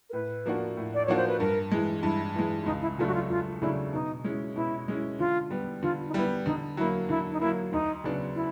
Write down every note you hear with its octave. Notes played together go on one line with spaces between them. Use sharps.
A#4
A2 B4
F3 A#3 D4 F#4
A2
D5
F3 A#3 D4 F#4 C#5
C5
B4
G2 A#4
E3 G#3
G2 E4
E3 G#3
E4
C#2 D#4
E4
C#3 F#3 A3 D4 F4
F#4
F4
C#2 F4
C#3 F#3 A3 D4 E4
B2 D#4
G#3 C#4 E4
B2 E4
G#3 C#4 E4
D3 F4
G3 B3
D3 F4
D#4
G3 B3 E4
D3 D#4
F#3 A#3 E4
D3 E4
D#4
F#3 A#3 E4
D2 D#4
C#3 F#3 B3 D4
E4